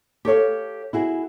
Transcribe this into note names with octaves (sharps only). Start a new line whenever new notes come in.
G4 A4 C#5 F5
E4 F#4 G#4